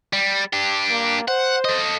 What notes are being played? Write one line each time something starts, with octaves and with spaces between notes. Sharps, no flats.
G3
D4 G4
A#3
C5 F#5
A4 D#5